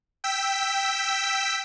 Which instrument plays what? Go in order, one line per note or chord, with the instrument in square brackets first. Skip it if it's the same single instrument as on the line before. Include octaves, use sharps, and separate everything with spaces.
[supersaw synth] G5 E6 B6